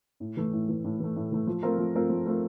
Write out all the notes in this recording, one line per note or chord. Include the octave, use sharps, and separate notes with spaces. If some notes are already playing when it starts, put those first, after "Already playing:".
A2
E3 A3
A2
E3 A3
A2
E3 A3
A2
E3 A3
F3
A3 C4 F4 A#4
F3
A3 C4 F4 A#4
F3
A3 C4 F4 A#4